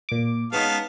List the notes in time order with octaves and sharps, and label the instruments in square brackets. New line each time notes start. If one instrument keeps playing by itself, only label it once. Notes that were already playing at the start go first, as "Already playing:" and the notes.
[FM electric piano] A#2 D6
[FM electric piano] G#3 C#4 D#4 [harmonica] B3 F5 A5